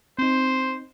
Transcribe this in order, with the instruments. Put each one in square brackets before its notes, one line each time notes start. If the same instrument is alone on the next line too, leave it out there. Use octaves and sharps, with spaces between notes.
[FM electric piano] C4 D#4 [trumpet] C5